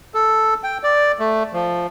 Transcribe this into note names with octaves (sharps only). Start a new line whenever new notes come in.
A4
G5
D5
A3
F3